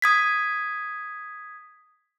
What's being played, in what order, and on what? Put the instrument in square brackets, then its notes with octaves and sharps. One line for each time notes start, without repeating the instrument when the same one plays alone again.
[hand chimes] D#6 G#6 B6